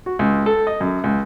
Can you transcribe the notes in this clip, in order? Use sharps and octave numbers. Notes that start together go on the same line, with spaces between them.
F#4
C#2
A4
D#5
F#2
C#2